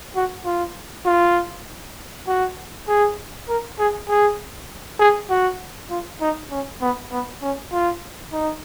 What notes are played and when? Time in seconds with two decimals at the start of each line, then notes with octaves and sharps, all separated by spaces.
0.16 F#4
0.46 F4
1.06 F4
2.27 F#4
2.88 G#4
3.49 A#4
3.79 G#4
4.09 G#4
5.00 G#4
5.30 F#4
5.90 F4
6.21 D#4
6.51 C#4
6.81 B3
7.12 B3
7.42 C#4
7.72 F4
8.33 D#4